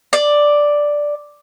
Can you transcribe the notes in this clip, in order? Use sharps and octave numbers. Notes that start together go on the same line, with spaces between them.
D5